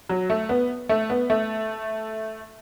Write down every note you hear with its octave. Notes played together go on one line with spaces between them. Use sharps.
F#3
A3
B3
A3
B3
A3